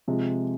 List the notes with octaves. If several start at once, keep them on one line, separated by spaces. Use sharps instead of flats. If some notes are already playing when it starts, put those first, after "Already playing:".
C3 F3 G#3